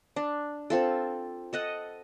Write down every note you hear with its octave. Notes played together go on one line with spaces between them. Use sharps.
D4
C4 F4 A4
A4 D#5 F#5